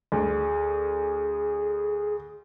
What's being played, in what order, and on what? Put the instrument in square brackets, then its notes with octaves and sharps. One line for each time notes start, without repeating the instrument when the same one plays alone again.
[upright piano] D2 [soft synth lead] G#4